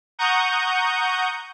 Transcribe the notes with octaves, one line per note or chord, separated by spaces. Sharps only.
F#5 A#5 C#6 D#6 G6